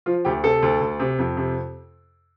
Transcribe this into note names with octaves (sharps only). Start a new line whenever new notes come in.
F3 F4
D2 G4
C3 A4
D2
D2
C3
F2
C3